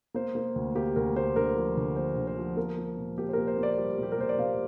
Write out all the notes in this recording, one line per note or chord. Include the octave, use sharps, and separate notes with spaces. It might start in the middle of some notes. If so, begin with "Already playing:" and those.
A#3 C5
A#3
D2
A#3 G4
D2 A#4
A#3 C5
D3 A#4
F3
D3
A#3 C5
D3
C5
F3
A#3 A#4
A#3
A#2
A#3 G4
C5
A#4
A#3
C5
A#3
D5
G3
A#2 G4
A#4
A#2 C5
D5
A#2 F5